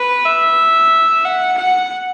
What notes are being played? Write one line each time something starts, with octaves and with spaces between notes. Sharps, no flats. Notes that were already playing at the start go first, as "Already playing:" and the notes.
Already playing: B4
E5
F#5
F#5